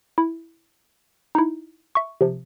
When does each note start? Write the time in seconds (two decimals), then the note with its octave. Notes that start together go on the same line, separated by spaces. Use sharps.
0.18 E4
1.35 D#4 E4
1.95 E5 C#6
2.21 C3 F3